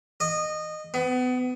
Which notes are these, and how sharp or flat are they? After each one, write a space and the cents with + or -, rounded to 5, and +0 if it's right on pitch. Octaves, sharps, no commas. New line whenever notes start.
D#5 -20
B3 +30